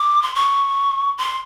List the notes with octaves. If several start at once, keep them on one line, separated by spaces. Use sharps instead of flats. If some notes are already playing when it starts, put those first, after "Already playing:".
Already playing: D6
C6
C#6
C6